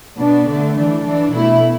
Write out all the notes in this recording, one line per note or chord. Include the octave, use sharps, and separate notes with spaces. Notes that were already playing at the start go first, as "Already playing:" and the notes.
B2 B3 D4
D3 A3 D4
E3 D4
E3 D4
B2 A3 E4